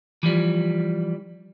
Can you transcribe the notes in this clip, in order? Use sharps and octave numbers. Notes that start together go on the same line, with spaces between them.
E3 F3 G3